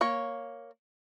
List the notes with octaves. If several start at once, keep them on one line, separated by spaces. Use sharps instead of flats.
A#3 C#5